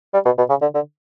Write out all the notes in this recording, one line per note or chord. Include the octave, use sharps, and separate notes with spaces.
G3
B2
B2
C#3
D3
D3